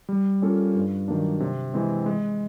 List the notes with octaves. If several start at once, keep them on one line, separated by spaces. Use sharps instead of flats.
G3
A#3 C#4 F4 A4
G2
D#3 F#3 A#3 D4
C3
E3 G#3 C4
G#3